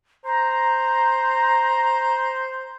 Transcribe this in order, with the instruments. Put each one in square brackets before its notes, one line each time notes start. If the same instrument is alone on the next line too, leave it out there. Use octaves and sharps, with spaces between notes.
[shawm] C5 [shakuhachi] A#5